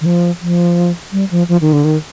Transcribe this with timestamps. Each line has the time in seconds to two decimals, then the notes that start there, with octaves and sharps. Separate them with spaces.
0.01 D#3
0.06 F3
0.41 F3
1.12 G3
1.31 F3
1.49 F3
1.61 D#3
1.73 D3
1.84 D#3